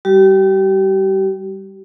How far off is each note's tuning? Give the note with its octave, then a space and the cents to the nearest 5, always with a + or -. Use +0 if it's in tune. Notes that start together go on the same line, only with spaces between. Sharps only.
G3 +0 G4 -35